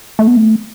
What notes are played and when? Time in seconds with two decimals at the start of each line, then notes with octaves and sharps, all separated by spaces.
0.19 A3
0.27 B3
0.36 A3